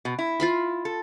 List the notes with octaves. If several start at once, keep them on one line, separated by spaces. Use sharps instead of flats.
B2
E4
F4 F5 B5
A4